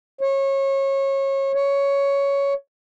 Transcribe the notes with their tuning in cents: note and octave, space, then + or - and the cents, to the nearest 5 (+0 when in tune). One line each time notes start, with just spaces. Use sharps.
C#5 -25
C#5 +10